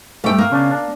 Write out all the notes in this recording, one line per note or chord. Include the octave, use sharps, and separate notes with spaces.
G3 A3 G5
A#3
C#3 C#4 D4
D4